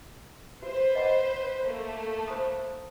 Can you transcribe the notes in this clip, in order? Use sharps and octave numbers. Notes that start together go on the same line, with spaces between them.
F#4 B4 C5
D#5 F#5
A3 A#3
C5 B5 D#6